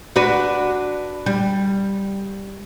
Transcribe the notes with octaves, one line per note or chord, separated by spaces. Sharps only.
D4 F#4 B4
G3